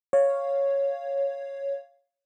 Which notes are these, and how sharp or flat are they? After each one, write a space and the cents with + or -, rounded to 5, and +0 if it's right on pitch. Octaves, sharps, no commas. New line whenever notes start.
C#5 +0 F5 +0